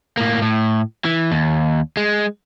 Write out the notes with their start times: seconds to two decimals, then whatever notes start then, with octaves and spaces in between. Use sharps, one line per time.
0.17 A2 A#3
0.42 A2
1.05 E3
1.32 D#2
1.97 G#3